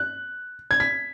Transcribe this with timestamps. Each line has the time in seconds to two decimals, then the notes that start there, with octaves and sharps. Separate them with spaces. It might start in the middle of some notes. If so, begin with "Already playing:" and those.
Already playing: F#6
0.71 G#6
0.80 B6